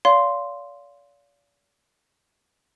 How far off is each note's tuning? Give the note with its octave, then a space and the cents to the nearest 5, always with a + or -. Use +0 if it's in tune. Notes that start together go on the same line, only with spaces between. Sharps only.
D5 -45 F5 +0 C6 +0